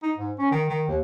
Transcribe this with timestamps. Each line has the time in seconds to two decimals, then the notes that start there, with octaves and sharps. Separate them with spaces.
0.03 D#4
0.18 G#2
0.39 C#4
0.51 D#3
0.69 D#3
0.88 D#2